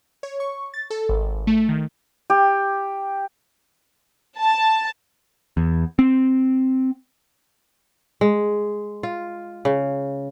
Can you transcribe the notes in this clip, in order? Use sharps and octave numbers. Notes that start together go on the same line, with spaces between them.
C#5
C#6
A6
A4
G#1
A3
D#3
G4
A5
E2
C4
G#3
F4
C#3